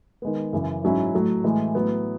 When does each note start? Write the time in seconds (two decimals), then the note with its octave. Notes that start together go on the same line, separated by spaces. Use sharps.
0.22 D#3 G#3 B3
0.53 F#2 C#3 E3
0.84 G#2 F#3 C#4 E4
1.14 A2 F#3 A3
1.44 A2 E3 G#3
1.75 A2 F#3 B3